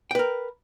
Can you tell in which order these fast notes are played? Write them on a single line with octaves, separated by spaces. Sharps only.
G5 B4 A#4